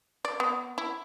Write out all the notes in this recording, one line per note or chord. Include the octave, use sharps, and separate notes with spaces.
D5
B3
E4